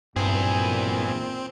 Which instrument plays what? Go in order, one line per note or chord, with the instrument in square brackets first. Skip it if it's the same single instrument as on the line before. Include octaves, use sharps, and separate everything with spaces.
[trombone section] B1 A#2 [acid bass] G2 [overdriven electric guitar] E3 G#4 [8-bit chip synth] C4